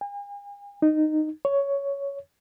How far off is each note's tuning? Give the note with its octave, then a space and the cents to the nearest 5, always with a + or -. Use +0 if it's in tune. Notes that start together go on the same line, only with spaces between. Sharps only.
G#5 -45
D#4 -15
C#5 +10